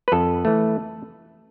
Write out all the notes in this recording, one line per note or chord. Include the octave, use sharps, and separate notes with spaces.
B4
F2 A4
E3 A3